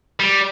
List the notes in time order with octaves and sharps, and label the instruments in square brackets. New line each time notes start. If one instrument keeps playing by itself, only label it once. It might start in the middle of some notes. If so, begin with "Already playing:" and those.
[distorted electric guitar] G3